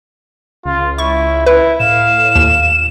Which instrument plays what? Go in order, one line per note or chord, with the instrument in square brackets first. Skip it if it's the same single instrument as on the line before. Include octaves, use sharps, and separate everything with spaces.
[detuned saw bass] C#2 [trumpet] F4
[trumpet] E4 [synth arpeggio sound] C#6
[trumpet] E4 [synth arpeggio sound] B4
[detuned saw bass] A2 [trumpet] F5 [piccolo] E7
[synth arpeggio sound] D#2